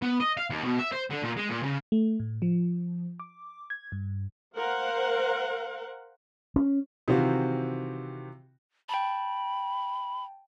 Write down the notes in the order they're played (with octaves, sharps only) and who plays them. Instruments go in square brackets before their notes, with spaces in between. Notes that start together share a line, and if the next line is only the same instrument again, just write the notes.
[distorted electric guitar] B3
D#5
F5
D#2
B2
E5
C5
D3
A#2
G#3
A#2
C#3
[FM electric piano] A3
A2
F3
D6
G#6
G2
[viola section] A#4 C5 F5 F#5
[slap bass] C#4
[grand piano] C3 D#3 E3 C4 F4 F#4
[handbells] G5 A5 [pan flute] B5